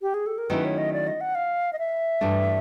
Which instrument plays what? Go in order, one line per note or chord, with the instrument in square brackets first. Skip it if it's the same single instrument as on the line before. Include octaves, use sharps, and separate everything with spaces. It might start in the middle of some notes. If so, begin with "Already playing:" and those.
[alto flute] G4
G#4
A4
A#4
[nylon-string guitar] D#3 F#3 A3 C#4 E4 [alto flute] B4
[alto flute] C#5
D#5
D5
D#5
F#5
F5
D#5
E5
[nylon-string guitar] G2 E3 A3 D4